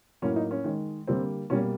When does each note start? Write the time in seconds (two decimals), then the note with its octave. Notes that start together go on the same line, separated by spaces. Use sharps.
0.22 A2 F#3 A#3 C#4
0.36 D#4
0.51 C#4
0.64 D#3 G#3
1.07 D3 G3 A#3 C4
1.50 B2 G3 A#3 C#4